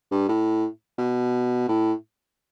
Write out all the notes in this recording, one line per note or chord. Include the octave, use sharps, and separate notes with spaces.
G2
A2
B2
A2